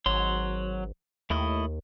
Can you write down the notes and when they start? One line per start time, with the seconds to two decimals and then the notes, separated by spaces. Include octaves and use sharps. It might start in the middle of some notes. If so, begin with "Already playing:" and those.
0.06 G#1 F#3 C#5 C6
1.30 D#2 A3 E4 D#5